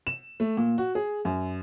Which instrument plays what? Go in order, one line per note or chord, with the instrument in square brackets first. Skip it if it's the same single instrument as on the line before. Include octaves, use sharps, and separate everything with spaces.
[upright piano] E7
A3
A#2
F#4
G#4
F#2